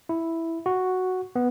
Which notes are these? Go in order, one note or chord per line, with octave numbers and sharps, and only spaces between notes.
E4
F#4
B3